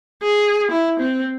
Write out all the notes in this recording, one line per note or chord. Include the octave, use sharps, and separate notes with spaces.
G#4
E4
C4